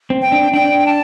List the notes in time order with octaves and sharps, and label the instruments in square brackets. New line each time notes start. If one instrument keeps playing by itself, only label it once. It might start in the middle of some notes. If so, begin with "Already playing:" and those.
[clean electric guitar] C4
[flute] G5
[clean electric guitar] D4
[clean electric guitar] D4 [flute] G5
[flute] A5